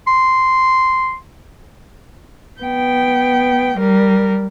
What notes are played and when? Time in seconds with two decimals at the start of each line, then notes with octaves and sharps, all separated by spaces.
0.07 C6
2.61 B3 G5
3.78 G3 A#4